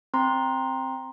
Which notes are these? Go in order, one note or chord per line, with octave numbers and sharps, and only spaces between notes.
C4 A#5 C6